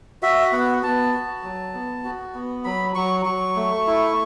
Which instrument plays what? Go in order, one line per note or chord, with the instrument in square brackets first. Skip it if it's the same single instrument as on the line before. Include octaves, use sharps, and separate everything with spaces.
[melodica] F#4 E5
B3 F#5
B3 A5
F#4
F#3
B3
F#4
B3
F#3 B5
F#3 C#6
F#3 C#6
A3
E4